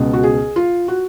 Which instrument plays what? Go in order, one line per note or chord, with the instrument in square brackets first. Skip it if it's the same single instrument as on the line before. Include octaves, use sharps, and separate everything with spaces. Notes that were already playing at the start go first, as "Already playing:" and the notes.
Already playing: [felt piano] C#2 B2
F#4
G#4
F4
F#4